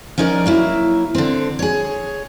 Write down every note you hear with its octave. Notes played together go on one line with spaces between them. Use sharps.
F3 C#4 D#4 A#4 D5
F#3 A#3 E4
D3 C4
G#4 C#5